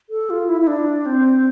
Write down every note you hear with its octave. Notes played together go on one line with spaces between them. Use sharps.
A4
F4
E4
E4
D4
C4